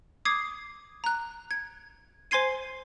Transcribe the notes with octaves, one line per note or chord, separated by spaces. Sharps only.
D6 D#6 G#6 C7
A#5 F#6
G#6
C5 G#5 C6 G#6 C7 D#7